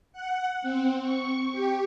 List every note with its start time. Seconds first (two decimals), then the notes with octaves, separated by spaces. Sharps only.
0.13 F#5
0.62 C4
1.01 C#6
1.52 G4